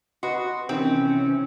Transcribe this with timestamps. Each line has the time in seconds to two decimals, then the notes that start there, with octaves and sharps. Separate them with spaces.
0.23 F#4 B4 D#5 C6
0.69 C3 D#3 E3 C4 C#4